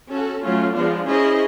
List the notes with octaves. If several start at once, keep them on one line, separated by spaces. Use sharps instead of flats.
C#4 F#4 A4
F#3 A3 C#4 F4
F3 G#3 B3 D4 F4
C#4 E4 G#4 C5 D#5